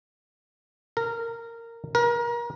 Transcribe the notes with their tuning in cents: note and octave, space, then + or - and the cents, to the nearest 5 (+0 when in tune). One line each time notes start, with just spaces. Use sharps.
A#4 -15
A#4 +30